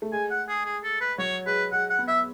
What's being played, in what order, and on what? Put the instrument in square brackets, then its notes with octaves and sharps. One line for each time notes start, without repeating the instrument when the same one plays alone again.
[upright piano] A3
[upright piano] G#3 [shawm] G#5
[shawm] F#5
G#4
G#4
A4
B4
[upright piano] F#3 [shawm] C#5
[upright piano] G#3 [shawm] B4
[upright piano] G#3 [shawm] F#5
[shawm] F#5
[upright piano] B3
[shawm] E5